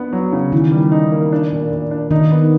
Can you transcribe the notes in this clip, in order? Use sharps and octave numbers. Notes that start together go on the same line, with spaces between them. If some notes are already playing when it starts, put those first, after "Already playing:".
Already playing: B3 D4
F#3
C#3
D#3 E3
G3
D#4
A#3
D4
A#2
A#2
D4
D#3 D#4
B3